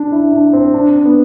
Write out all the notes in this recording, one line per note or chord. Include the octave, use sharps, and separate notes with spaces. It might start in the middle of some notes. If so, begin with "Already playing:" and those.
Already playing: D4
E4
D4
C4
D4
B3